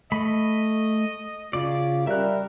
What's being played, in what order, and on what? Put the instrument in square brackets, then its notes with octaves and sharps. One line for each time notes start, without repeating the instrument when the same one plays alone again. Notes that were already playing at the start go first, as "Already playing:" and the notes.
[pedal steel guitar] A3 B5 [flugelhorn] D#5
[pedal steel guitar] C#3 D5 [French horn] F4
[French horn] G3 [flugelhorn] A#4 [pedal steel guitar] E5 F#6